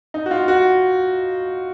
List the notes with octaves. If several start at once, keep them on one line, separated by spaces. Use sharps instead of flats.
D#4
F#4
F4
F#4